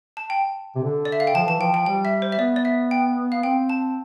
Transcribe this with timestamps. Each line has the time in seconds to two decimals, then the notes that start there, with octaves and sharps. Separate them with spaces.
0.17 A5
0.30 G5
0.76 C3
0.83 D3
1.05 D5
1.12 E5
1.20 F5
1.27 G5
1.35 F3 A5
1.47 E3 A5
1.60 F3 G5
1.74 G5
1.86 G3 G5
2.05 E5
2.22 C5
2.32 E5
2.39 B3 D5
2.56 D5
2.65 E5
2.91 G5
3.32 F5
3.43 C4 G5
3.70 A5